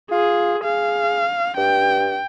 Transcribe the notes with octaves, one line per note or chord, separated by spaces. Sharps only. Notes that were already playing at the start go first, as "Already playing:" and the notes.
F4 G#4
G#4 F5
G2 G5